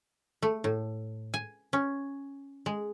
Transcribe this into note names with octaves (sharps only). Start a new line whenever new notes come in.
A3
A2
G#5
C#4
G#3